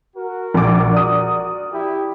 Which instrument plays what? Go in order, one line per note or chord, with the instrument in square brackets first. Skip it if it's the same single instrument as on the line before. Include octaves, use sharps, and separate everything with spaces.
[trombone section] F#4 A#4
[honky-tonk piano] A#1 D6
D5 D#6
[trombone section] E4 G4